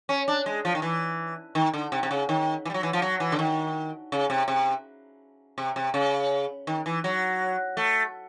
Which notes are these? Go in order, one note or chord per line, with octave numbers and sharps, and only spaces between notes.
C#4
D4
G#3
F3
D#3
E3
D#3
D3
C3
C3
C#3
D#3
E3
G3
F#3
E3
F3
F#3
E3
D3
D#3
C#3
C3
C3
C3
C3
C#3
D#3
E3
F#3
A3